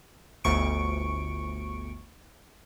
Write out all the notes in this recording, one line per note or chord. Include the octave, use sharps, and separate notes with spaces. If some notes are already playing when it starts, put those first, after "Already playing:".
G1 D2 C#6 C#7 D7